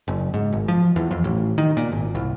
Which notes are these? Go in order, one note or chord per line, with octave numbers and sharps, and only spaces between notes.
F#1
G#2
G#1
F3
E2
F2
A1
D#3
A#2
G#1
C2